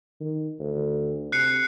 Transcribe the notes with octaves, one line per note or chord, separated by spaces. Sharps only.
D#3
D2
C3 F#6 C7 C#7